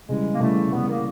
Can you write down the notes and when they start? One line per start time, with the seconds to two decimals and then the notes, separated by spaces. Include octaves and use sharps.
0.08 C#3 E3 G3 G#3
0.33 A#3
0.40 C#3 E3 G3 A3
0.72 C#3 E3 G3 B3
0.88 A#3